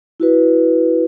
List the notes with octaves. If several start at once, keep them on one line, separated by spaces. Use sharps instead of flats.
E4 F#4 B4